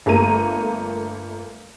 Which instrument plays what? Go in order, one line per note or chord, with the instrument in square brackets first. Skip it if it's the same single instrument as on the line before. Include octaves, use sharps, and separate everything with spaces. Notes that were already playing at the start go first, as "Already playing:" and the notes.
[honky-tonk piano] G1 A3 A#3 A#5 D#7